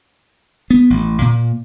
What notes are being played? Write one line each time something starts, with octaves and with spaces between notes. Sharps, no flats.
B3
A1
A#2